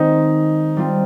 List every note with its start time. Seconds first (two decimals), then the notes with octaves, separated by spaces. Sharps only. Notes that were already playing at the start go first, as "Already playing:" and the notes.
Already playing: D#3 G#3 C4 D#4
0.76 G3 C4 F4